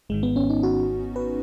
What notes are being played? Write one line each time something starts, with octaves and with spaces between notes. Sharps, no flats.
G#1 G#2 D#3 G#3
B3
C#4
D#4
F#4
B4